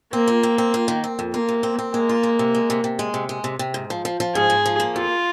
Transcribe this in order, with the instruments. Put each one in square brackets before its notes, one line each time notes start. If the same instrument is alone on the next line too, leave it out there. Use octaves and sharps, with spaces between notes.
[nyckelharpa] A#3 [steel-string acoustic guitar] C4
[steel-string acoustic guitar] F4
C4
C4
F4
D#3
C4
F2
[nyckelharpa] A#3 [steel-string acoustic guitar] F4
[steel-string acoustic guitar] C3
C4
C4
[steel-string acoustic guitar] G#3 [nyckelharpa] A#3
[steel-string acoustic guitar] F4
G#3
C3
G#3
C3
C3
G#3
C3
G#3
C3
C3
G#2
F3
F3
F3
[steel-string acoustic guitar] G#2 [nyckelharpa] G#4
[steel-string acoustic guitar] G#2
F3
A#3
[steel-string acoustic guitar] F2 [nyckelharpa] F4